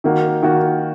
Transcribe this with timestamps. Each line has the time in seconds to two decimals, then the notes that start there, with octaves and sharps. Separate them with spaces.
0.04 D#3 A#3 F#4
0.43 D#3 A#3 F#4